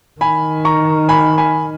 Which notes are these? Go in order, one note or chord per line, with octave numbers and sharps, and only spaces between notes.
D#3 G#5 B5
A#5 C#6
G#5 B5
G#5 B5